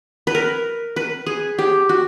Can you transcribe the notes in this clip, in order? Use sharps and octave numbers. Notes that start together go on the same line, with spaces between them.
B4
A#4
B4
G#4
G4
F#4